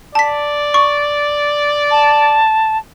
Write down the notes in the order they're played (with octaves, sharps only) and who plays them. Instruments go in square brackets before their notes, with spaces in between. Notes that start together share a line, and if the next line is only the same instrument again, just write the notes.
[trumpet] D5 [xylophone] A5 B6
[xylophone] C#6
[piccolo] A5